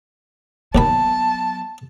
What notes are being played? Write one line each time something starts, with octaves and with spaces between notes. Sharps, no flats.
D#2 D#3 F#3 B3 A5 B5